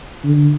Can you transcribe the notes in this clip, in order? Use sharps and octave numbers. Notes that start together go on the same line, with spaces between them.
D3